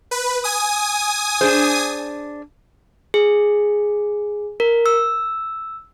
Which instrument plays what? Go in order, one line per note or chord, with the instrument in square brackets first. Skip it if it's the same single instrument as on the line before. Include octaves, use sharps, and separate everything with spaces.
[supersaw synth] B4
G#5 D#6
[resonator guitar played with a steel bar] D4 G#4 C5
[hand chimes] G#4
A#4
E6